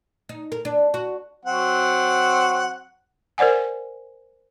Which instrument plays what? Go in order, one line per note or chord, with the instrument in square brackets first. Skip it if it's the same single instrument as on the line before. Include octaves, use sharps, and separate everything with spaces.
[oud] D#4
A#4
D4
F#4
[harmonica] F#3 C4 F#5
[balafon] A#4 C5 D5 F#5 G#5